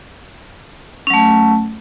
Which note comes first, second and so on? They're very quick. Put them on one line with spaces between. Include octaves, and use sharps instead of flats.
C#4 F#3 A3